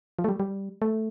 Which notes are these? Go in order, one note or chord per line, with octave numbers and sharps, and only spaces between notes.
F3
A3
G3
G3
A3